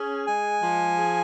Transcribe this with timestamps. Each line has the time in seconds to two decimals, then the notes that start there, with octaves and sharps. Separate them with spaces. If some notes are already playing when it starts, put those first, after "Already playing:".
Already playing: C#4 G#4
0.27 G#3 G#5
0.62 F3
0.97 G#4